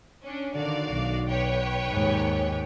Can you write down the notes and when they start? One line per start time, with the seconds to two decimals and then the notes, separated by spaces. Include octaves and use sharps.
0.23 C#4 D4
0.54 D3 D#3 F#4 D5 F5
0.90 B1
1.29 B4 C#5 G5
1.88 D#2 G#2